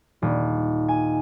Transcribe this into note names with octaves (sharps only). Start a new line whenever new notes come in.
D#1
G#5